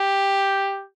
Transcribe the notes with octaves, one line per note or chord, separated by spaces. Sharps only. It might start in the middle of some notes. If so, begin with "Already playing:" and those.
Already playing: G4